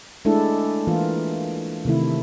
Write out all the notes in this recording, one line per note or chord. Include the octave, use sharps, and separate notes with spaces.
G#3 A3 D4 E4 A4
E3 A#3 F4
C3 D#3 A3 E4